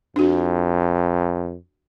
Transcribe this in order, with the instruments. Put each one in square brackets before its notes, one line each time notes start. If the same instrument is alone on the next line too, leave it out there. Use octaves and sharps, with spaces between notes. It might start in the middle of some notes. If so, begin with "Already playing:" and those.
[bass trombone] F2 [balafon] D4 F#4